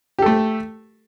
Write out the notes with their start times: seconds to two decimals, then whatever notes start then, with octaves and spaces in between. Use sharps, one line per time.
0.19 G4
0.22 A4
0.26 A3